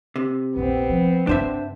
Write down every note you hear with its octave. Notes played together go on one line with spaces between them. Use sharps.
C3
A#1 E2 B3 C4
F3
G2 C#3 D4 C5 E5